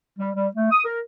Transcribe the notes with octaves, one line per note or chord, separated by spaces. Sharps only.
G3
G3
A3
D#6
A#4